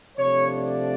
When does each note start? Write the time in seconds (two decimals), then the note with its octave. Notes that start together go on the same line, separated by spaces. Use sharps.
0.18 C3 F3 A3 D4 C#5
0.57 D5